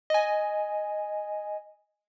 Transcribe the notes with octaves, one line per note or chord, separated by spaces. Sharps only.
D#5 G#5